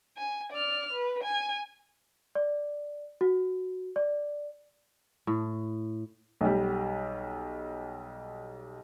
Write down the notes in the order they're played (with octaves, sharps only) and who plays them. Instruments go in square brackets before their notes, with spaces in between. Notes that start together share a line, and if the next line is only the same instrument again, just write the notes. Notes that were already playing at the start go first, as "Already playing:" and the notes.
[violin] G#5
D5 F6
B4
G#5
[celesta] D5
F#4
D5
[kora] A2
[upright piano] B1 G3